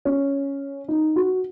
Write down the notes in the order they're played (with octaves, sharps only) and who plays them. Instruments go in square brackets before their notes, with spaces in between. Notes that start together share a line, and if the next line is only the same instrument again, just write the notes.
[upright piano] C#4
D#4
F#4